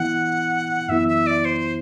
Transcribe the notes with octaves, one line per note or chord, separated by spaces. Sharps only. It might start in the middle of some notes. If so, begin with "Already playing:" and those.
Already playing: E3 B3 E4 F#5
F#2 E3 B3 E4 E5
E5
D5
C5